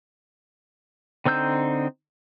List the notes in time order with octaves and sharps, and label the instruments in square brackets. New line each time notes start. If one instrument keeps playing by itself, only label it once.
[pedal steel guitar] D3 C4 D#4 E6 G6